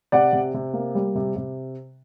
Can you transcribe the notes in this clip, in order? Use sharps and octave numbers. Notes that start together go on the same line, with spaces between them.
C3 D5 F#5
C3
C3
A#3
G3
C3
C3